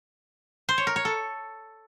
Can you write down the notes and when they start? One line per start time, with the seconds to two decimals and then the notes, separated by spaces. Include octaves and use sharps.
0.69 C5
0.78 C#5
0.87 A#4
0.96 C#5
1.05 A4